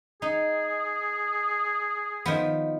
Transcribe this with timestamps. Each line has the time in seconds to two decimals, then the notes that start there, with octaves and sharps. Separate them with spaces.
0.22 D#4 G#4
2.26 D#3 F3 B3